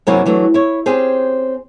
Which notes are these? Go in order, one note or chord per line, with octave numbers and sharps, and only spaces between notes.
F#2 C3 F#3 A#3 C#4 E4
E3 F#3 A3 D4
E4 C#5
C4 C#4 G4 G#4 C5